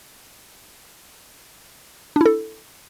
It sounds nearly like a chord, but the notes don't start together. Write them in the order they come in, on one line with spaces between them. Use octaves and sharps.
D4 E4 A4